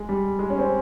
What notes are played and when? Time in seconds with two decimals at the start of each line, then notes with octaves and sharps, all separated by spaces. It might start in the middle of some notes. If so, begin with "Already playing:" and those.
Already playing: G#3
0.09 G3
0.39 G#3
0.50 C#4
0.59 C4